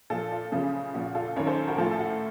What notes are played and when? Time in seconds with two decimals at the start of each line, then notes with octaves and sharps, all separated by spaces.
0.10 A#2 F3 F4 A4
0.32 F4
0.52 F#2 C#3 F3
0.94 A#2 F3 F#4
1.05 F#4
1.15 F4 A4
1.36 F#2 D#3 A#4 C#5
1.47 A4 C5
1.68 F#4 A#4
1.78 A2 F3 F4 A4
1.91 A4
1.99 F#4